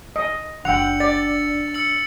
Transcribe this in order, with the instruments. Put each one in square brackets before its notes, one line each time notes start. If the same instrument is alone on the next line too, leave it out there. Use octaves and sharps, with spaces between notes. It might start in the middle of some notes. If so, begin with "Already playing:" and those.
[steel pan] D#5
[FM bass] F#1 [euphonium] D4 [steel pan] F#5 G5 [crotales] E6 C#7 F7
[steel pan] D5 [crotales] A6
[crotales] E6 C#7 F#7